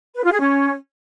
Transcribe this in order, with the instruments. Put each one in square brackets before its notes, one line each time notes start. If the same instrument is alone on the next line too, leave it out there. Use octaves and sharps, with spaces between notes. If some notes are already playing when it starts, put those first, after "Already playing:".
[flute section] B4
F4
G#4
C#4